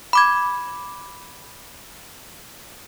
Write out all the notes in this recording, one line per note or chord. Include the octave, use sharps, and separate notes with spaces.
B5 D6 G#6